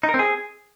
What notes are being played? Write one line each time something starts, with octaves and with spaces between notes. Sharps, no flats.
D#4
A#4
C4
G#4